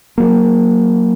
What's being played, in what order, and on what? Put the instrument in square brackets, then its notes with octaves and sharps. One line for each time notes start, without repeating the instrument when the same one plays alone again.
[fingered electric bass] F#3 A#3